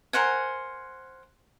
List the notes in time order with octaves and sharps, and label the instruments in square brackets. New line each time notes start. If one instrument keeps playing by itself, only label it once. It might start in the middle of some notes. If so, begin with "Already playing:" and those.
[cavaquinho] A#4 C5 F#5 G#5